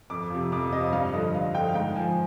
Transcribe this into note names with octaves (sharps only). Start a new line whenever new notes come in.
F2 D6
C3 F3
F2 D6
C3 F3 D#5
G2 F5
D3 F3 D#5
G2 F5
D3 F3 G5
F5
G#2 G5
F3 G#5